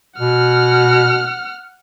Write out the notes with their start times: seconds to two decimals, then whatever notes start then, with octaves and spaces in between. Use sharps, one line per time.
0.20 B2 F#5 F6